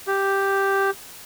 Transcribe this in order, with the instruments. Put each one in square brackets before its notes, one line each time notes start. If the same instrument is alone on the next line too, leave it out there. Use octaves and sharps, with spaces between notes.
[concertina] G4